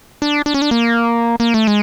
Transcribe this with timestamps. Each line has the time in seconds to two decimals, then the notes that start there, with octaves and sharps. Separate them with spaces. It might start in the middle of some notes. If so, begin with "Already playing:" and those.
0.22 D4
0.46 D4
0.54 C#4
0.62 D4
0.71 A#3
1.40 A#3
1.54 A3
1.67 G#3